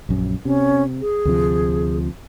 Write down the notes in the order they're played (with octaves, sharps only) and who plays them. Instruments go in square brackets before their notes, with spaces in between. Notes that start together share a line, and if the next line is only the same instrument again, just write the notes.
[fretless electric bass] A#1 F#2
[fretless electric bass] C3 [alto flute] C#4
[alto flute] G#4
[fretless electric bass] D2 C3 F3